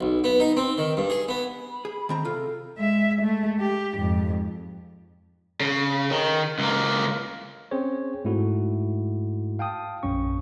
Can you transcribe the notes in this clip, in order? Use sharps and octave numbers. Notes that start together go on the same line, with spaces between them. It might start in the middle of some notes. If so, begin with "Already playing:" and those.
B1
B3
D#4
C4
D#3
G2
G#4
B3
B5
G#4
D#3 C4 A#5
C3 F4 A4
G#3 E5
G#3 A3
G4
F2 G#2
C#3
D#3
C#2 A#3
C4 C#4 G#4 C5 C#5
G#2 A3 E4 F#4
F5 G5 A5 D#6
A#1 F#2 C#4 C#6